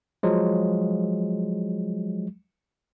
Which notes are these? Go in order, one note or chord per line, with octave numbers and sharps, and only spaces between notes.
F3 F#3 G#3